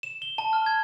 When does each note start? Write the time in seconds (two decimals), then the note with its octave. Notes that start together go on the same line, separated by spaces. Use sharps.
0.03 E7
0.22 G7
0.38 A5
0.53 F6
0.66 G#6